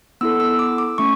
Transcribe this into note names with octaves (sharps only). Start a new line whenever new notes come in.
B3 E4 A4 E6
E6
D6
D6
A3 C#4 C#6